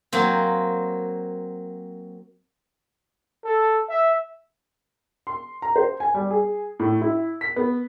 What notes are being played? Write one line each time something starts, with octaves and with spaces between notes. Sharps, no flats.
F#3 A#3 C4
A4
E5
C6
A#5
C5
G#5
G3
G#4
A2
E4
B6
B3